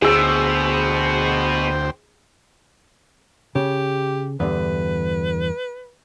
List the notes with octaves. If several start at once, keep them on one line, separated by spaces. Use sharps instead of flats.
D2 B2 G#4 C5 G5 E6
C#3 G4
E2 G2 D3 B4